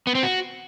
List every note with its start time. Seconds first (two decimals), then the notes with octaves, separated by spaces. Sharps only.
0.07 B3
0.15 C4
0.23 F#4